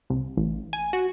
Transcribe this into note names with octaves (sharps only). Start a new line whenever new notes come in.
C2
A1
G#5
F#4